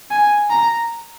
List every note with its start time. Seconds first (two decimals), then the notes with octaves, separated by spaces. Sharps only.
0.11 G#5
0.50 A#5